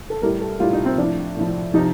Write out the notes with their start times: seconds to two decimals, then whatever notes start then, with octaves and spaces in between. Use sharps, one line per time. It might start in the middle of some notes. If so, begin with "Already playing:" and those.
0.10 A4
0.22 A2 G3 A#4
0.41 A4
0.60 A2 G3 F4
0.73 D#4
0.85 C4
0.98 A2 F3 D4
1.37 A2 F3
1.74 C3 F3 D#4